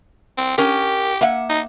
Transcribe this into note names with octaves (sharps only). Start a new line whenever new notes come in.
C4
C#4 G4 A#4
A#3 E5 F#5
D#4